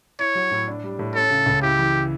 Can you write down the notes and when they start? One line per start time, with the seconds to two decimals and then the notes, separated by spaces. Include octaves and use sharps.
0.19 E4 C#5
0.35 F#3
0.51 A2
0.68 D4
0.83 G3
0.99 A2
1.15 C#4 A4
1.30 C#3
1.46 C#2
1.62 E4 G4
1.79 E3